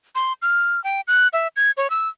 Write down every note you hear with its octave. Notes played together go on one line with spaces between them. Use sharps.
C6
F6
G5
F#6
E5
G#6
C#5
E6